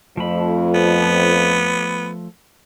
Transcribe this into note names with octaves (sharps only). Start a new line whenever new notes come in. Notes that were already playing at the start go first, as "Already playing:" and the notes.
F2 F3 A3 B5
B3